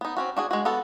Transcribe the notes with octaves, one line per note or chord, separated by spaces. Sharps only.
B3 D#4
C4 C#4 F#4
D4 F#4 G#4
G#3 F#4
B3 F#4 A4